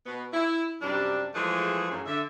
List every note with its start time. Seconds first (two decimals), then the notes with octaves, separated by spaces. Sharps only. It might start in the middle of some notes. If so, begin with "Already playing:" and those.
0.06 B2 B3
0.33 E4
0.82 F#2 C3 G3 D4
1.34 E3 F3 G#3 A3 G#4 F#5
1.90 F#2 A2 C#3
2.06 D3 E5